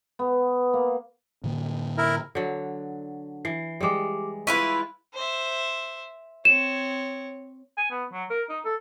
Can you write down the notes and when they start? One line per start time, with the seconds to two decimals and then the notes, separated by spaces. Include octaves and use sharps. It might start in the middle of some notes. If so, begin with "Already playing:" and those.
0.19 B3
0.73 A#3
1.44 A2 D3 A#3
1.98 E4 A#4
2.35 D3 F#3
3.45 E3 C7
3.81 G3 G#3 G4 D6
4.47 E4 F4 B4 C#6 B6 D#7
5.14 C5 E5
6.45 C4 C#5 E7
7.77 G#5
7.91 B3
8.13 F#3
8.30 A#4
8.49 D#4
8.65 A4